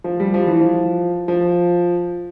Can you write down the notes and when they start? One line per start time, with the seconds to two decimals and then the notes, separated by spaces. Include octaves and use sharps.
0.04 F3
0.20 G3
0.34 F3
0.47 E3
0.61 F3
1.28 F3